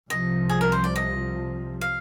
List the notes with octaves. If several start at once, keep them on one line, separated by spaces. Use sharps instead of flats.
C2 C3 F3 D#5
G#4
A#4
C5
D5
D#5
F5